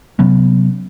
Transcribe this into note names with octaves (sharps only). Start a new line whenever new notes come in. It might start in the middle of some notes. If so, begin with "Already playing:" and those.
C3 F#3 B3 C#4